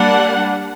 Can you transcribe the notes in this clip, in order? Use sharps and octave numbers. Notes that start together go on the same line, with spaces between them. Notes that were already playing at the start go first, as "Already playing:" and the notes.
Already playing: G3 A#3 D4 F#5